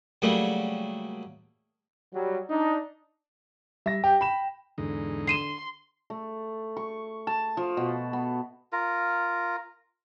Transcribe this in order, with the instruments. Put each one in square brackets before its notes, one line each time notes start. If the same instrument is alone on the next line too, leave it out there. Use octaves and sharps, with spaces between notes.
[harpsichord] C#3 F#3 G3 A3 A#3
[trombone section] F#3 G3
D4 D#4
[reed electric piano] G3 [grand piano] E5 A#6
[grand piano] G4 [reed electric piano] G5
[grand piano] B5 E7
[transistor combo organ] E2 G#2 D#4 [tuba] D3
[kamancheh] C6 [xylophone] C7 D#7 E7
[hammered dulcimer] A3
C#6
A5
F3
B2
B3
[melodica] F4 A#4